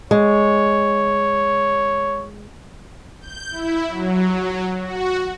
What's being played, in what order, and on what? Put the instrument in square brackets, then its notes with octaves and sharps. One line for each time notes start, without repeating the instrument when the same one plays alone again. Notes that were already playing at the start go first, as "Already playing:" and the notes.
[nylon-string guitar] G#3 [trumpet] C#5
[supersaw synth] G6
E4
F#3
F#4